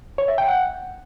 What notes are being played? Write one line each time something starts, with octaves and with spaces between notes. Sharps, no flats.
C#5
E5
G5
F#5